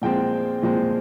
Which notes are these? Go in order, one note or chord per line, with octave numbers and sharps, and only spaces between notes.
A#2 F3 G#3 C4 G5
A#2 F3 G#3 C4